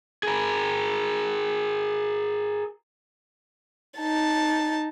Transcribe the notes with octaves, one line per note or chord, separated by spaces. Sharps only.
G#4 A#4
D#4 A5